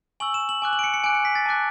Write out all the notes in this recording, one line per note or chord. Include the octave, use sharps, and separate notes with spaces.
G#5 C#6 E6 F#7
E7
F#7
G#5 D6 F#6
F#7
D7
C#7
C#7
G#5 D6 F#6 D7
C#7
B6
A6
A5 D6 F#6